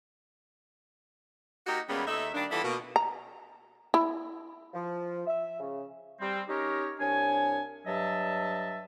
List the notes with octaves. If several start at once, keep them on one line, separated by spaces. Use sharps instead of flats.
A#3 D#4 F#4 G4
D#2 G3 G#3 A#3 B3 C#4
D#2 D#4 A4 E5
D#3 G3 A#3 D4
E3 G3 B3 E4 F4 A4
B2 A#3
A#5
E4
F3
E5
C#3
G3 C4
C#4 D#4 G4 A#4 C#5 D#5
C2 D4 C#5 G#5
G2 F#3 D#5 E5 A5